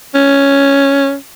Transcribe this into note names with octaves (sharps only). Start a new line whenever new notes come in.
C#4